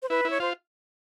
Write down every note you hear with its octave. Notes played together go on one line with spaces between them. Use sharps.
C5
E4 B4
E4
C#5
F4 C5